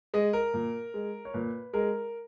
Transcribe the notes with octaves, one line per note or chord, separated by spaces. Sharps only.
G#3 D#5
A#4
A#2
G#3
C#5
A#2 B4
G#3 A#4